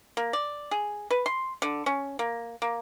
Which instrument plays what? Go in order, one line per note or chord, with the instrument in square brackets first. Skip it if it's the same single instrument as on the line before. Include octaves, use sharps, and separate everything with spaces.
[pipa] A#3
D5
G#4
B4
C6
D3
C#4
A#3
A#3